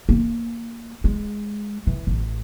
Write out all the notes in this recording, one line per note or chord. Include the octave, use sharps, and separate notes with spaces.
A#3
G#3
E3
A1